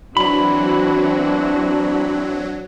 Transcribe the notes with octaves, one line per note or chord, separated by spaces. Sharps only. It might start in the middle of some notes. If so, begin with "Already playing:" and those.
E3 F#3 C4 D4 F#4 B5